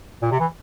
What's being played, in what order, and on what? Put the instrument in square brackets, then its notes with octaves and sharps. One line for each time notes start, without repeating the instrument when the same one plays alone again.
[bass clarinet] A#2
C3
E3